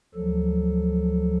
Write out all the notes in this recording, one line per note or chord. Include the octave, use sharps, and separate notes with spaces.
D2 F3 F#3 A4